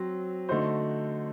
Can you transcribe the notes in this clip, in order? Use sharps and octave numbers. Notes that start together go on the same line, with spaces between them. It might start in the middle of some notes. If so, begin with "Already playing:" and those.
Already playing: F#3 C4
D3 A3 D#4 F#4 C5